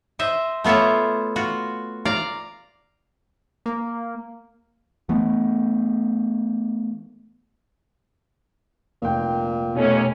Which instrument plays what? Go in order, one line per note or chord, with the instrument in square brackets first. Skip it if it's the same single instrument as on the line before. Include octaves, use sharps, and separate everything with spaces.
[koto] C5 D#5 E5
A3 B3 F4 C#5 E5
F4 F#4
D5 F5 A#5
[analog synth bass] A#3
[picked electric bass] E3 A3 B3
[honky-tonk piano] F1 G5 [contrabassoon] A#2
[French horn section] D#2 C#4 [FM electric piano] B2 A3